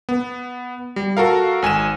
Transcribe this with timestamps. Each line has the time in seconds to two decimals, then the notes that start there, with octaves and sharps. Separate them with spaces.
0.09 B3
0.96 G3
1.17 F#4 A4 A#4 F5
1.62 G#1 G#5 D#7 E7